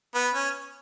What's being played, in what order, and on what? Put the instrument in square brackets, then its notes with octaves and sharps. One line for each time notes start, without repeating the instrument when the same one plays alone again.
[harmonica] B3
C#4